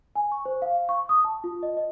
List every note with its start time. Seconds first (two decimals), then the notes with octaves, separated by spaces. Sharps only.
0.16 G#5
0.32 C#6
0.46 C5
0.62 F5
0.89 C#6
1.09 D#6
1.25 A5
1.44 F4
1.63 D#5
1.77 D#5